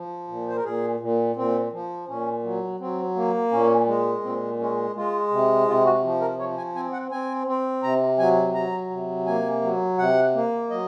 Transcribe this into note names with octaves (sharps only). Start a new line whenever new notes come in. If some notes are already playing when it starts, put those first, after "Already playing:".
Already playing: F3
A#2
C5
A#4
A#2 G#4
A#2
A#2 C4
F3
A#2 C#4
F#3
F#3 C4
A#3
A#2 C#4
G#3
A#2 C4
G#3 C#4
G#3 F4
C3
C3 F4
F#4
F3
A#4
F3 C#5
G#5
C4 G#5
F#5
C4 G#5
C4
C3 A#5
F#3 G#5
F#3 A#5
C3
A#3 G#5
F#3
C3 F#5
A#3
F#3 D#5